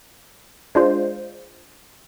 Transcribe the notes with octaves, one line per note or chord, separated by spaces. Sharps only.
G#3 D4 F4 C5